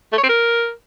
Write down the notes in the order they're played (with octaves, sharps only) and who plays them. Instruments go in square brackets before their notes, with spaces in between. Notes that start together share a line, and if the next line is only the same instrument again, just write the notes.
[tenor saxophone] A3
C#5
C4
A#4